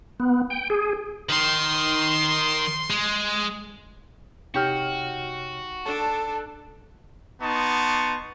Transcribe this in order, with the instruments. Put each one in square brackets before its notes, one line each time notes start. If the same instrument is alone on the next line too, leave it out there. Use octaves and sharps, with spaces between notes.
[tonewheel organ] B3
G5
G#4
[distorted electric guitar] D#3 [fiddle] C6
[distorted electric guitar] G#3
[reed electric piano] C3 C#5 F6 [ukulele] D#4 G4 [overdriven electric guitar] F#4
[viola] D4 A4 [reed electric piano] A5
[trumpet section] B3 D#4 A5 C6 C#6